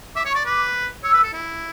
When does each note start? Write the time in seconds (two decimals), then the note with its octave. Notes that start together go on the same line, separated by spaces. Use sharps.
0.16 E5 D6
0.26 C#5
0.30 C#6
0.35 D5
0.46 B4 D6
1.04 C#5 E6
1.14 B4
1.23 A4
1.33 E4